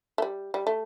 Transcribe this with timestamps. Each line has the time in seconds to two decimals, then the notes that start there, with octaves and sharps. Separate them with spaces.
0.18 A3
0.22 G3
0.54 G3
0.67 A3